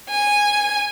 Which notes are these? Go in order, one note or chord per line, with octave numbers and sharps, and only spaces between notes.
G#5